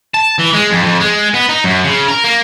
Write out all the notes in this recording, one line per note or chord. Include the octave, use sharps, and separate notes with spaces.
A5
E3
G#3
F2
F2
G#3
B3
D#4
F#2
C#3
A#4
A#3